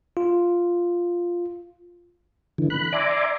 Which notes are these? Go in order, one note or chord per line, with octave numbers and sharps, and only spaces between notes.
F4
D3 E3
B5 F#6
D5 E5 G#5 A#5 C6 D6